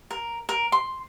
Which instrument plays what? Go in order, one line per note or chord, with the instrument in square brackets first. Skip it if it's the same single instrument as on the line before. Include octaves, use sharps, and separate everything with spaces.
[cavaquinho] A#4
A#4
C6